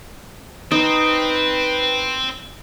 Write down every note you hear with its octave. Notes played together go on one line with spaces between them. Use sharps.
C4 D#4 B4